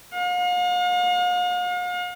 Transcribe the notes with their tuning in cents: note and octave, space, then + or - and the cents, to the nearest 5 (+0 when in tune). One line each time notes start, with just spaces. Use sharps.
F5 +45